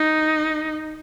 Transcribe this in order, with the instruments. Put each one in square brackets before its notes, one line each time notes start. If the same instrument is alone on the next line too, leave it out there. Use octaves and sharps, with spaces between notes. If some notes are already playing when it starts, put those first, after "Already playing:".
Already playing: [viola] D#4